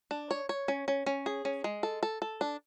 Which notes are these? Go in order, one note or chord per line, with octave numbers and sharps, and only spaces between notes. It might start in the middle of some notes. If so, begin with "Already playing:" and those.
D4
C#5
C#5
C#4
C#4
C#4
G#4
C#4
G#3
A4
A4
A4
D4